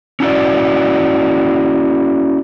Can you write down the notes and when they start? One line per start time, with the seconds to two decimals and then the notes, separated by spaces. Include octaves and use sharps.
0.20 C#4 E4 F#4 D5